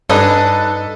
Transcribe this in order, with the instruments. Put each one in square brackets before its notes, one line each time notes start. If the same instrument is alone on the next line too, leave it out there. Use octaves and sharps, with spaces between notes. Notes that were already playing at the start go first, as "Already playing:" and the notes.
[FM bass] G2 [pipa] D4 [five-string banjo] D#4 D#5 G#5 [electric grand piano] A4 B4